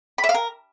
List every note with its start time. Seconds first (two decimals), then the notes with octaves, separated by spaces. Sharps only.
0.18 B5
0.24 E5
0.29 F5
0.34 A#4